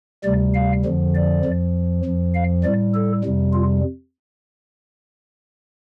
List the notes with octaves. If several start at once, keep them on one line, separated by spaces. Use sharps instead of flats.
D2 C3 G3 D5
F5
F2 D3 F3
D5
F2 F3
F2 F3
F5
A2 G3 D5
A4
F2 C3 G3
F4